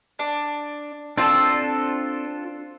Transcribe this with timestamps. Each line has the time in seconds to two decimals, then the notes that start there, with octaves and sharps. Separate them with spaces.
0.19 D4
1.17 C4 D4 F4 A4